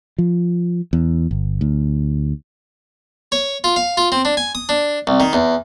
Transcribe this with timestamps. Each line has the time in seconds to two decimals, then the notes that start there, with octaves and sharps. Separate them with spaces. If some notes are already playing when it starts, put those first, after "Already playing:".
0.18 F3
0.93 E2
1.31 G1
1.61 D2
3.32 C#5
3.64 F4
3.76 F5
3.97 F4
4.12 C4
4.25 D4
4.37 G#5
4.55 D#6
4.69 D4
5.07 C2
5.20 D#3
5.33 E2